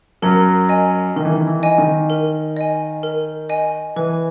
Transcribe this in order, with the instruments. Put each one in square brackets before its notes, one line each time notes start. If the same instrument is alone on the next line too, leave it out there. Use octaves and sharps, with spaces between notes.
[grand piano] F#2 F#3 [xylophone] A#4
[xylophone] D#5 G#5
[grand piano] D#3 [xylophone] A#4
[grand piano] E3
D#3
E3
[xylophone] D#5 G#5
[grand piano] D#3
[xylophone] A#4
D#5 G#5
A#4
D#5 G#5
[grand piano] E3 [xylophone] B4